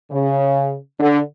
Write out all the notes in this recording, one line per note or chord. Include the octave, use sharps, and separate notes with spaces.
C#3
D3